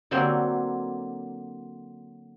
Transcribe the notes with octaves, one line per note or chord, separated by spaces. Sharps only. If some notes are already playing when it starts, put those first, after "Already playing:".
D3 F#3 A#3 C4 C5